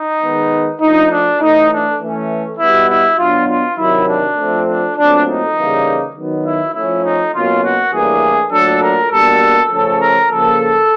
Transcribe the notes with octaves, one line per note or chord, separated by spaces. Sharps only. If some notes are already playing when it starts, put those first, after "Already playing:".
Already playing: D#4
D#3 G#3 B3
F3 A3 D4 D#4
D4
A2 E3 A3 D#4
D4
E3 A3 C#4
B2 G3 B3 E4
E4
B2 F#3 B3 D4 F4
F4
C3 D#3 F#3 E4
D4
F3 A3 C4
D4
A#2 F#3 A3 C4 D4
D#4
C#3 E3 G3 A#3
D#3 F#3 B3
E4
F3 A3 C#4 E4
D#4
B2 F#3 A#3 C#4 F4
F#4
A2 E3 G3 A#3 D4 G#4
A#2 F#3 A3 D4 A4
A#4
B2 G3 A#3 D4 A4
C#3 F3 A3 C#4 A4
A#4
C#3 F3 A#3 A4